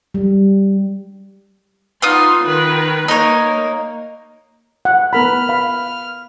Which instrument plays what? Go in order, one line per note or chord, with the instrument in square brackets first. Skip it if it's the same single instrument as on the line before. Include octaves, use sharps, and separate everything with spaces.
[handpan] G3
[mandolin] B3 F4 D#6 [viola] D#4 C6
[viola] D#3 B4
[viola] A#3 [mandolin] D#4 C#5
[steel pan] F#5
[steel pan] B3 A#4 B5 [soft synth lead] F6
[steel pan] F5 B5